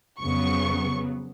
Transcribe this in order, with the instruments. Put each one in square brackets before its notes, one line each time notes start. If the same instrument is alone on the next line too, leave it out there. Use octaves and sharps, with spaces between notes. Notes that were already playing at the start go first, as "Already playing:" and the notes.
[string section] F2 C#3 F#3 B3 C#6